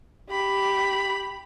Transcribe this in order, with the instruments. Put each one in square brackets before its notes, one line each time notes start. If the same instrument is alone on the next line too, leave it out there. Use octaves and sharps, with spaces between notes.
[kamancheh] G4 B5